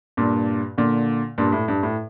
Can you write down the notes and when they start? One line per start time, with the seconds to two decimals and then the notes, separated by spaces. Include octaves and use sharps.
0.17 G2 A#2
0.78 A#2 D3
1.38 G2 A#2
1.52 A2
1.68 G2
1.83 A2